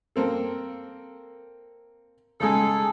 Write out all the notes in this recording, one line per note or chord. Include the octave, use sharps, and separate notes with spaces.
A#3 C4 A4
C#3 G#3 D#4 G#4 A4